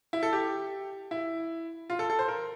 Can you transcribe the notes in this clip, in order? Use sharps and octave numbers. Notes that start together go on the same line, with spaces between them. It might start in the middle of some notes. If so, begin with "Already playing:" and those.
E4
A4
G4
E4
F4
A4
A4
C5
A#4